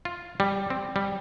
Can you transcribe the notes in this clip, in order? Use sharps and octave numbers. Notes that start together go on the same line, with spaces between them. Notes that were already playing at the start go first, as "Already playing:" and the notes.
F4
G3
C4
G3